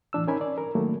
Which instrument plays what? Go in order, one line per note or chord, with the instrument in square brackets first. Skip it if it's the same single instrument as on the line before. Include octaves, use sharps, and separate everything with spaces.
[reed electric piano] A2 E3 D4 E6
C#4 D#4 A#4 G#5 B5
D5
A#4
D#3 F#3 A3 A#3